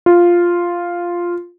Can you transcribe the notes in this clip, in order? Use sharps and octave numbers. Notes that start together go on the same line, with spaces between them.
F4